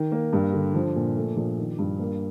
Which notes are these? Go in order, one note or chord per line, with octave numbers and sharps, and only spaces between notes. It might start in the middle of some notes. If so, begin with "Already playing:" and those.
Already playing: D#3
A#3
G2
D3
F3
A#2
A3
A#1
D#3
G2
A#3